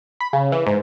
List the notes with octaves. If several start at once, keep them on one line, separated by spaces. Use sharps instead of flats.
B5
C#3
E3
G#2